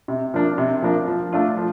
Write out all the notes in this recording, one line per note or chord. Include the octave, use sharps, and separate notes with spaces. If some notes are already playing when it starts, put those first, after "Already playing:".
C3
F3 A#3 D4
C3
F3 A#3 D4
F3
A3 D4 F4
F3